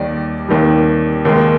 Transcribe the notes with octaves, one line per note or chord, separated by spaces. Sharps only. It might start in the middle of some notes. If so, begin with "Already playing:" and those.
Already playing: D#2 D#3 G3 D5
D#2 D#3 G3
D#2 D#3 G#3